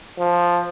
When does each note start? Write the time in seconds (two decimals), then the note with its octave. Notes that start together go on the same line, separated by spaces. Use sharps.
0.19 F3